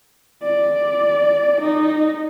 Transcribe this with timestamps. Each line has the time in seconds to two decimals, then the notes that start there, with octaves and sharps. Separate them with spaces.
0.42 D5
1.61 D#4